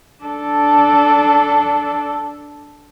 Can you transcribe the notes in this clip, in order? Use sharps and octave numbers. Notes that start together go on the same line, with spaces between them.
D4 A4